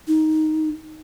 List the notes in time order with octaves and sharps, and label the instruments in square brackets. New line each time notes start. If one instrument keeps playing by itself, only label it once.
[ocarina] D#4